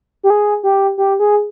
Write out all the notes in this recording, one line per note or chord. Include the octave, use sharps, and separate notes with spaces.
G4
G#4
G4
G4
G#4